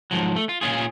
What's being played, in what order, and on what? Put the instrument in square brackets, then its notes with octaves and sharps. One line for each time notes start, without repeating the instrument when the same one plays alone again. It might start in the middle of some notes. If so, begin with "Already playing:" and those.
[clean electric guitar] G#2 F3 F#3
A3
F4
A#2 C#4 F4 G#4